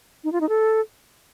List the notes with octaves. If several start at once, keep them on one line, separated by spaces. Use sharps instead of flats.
D#4
F4
D#4
A4